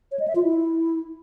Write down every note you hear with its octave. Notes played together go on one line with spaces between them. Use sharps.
C#5
D#5
E5
F4
E4